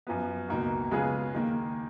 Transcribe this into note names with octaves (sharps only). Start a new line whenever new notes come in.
F#2 F3 B3
C#2 B2 A#3 D#4 F#4
C#3 G#3 B3 F4 G#4
D#2 D#3 A#3